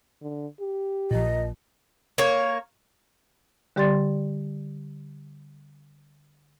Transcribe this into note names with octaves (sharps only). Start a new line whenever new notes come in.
D3
G4
A#1 A#2 D#5
A#3 C#5
D3 G3 G4 D5 C6 A6